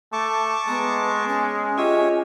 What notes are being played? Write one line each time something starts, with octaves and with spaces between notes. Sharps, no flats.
A3 A5 C#6 D6
G#3 B3 A#5
C#4
F4 G4 G#4 C#5 D#5 E5